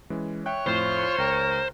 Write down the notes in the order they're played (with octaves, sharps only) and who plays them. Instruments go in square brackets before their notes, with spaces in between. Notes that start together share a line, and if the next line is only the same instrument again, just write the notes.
[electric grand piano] E3 G#3 C#4
[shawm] C#5 [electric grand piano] E5 G5 F#6
[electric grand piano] F2 A2 [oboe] F4 [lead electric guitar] C5
[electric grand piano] C#2 G5 E7 [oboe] A#4